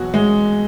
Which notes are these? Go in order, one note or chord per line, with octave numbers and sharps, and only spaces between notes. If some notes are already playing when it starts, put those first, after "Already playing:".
Already playing: E2 B2 F#3 F#4
G#3